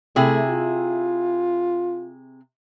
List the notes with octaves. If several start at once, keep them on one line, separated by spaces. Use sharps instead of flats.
C3 A3 E4 G#4
F4